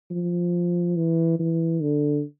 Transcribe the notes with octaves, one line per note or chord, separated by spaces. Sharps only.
F3
E3
E3
D3